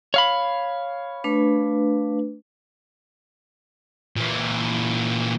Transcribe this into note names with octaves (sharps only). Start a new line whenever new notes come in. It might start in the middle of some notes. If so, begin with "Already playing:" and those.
C#5 F5 B5
A3 D4 B4
A#2 E3